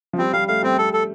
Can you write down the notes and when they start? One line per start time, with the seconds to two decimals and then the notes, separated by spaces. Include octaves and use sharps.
0.13 F3
0.18 G3 C4
0.33 G3 F5
0.48 A3 F5
0.63 G3 C4
0.78 A4
0.93 A4